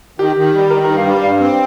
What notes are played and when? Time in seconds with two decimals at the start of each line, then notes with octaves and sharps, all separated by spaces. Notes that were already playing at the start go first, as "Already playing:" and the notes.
0.19 D#3 G4
0.36 D#3
0.54 G3
0.70 D#3 A#4
0.84 G2 A#4
0.97 F5
1.06 G3
1.23 G2 F5
1.40 C4